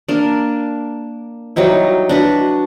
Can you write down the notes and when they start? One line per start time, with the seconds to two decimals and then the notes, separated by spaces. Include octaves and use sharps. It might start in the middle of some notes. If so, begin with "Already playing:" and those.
0.09 A#3 D4
1.56 F#3 G3 D#4 E4
2.09 D4 F#4 B4